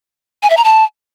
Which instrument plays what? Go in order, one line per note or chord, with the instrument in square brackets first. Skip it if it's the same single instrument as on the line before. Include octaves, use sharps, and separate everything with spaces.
[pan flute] G#5
E5
A#5
A5